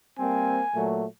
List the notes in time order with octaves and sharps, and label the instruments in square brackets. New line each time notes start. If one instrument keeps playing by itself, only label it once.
[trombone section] G3 A#3 C4 [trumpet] G#5
[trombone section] A#2 F#3 A3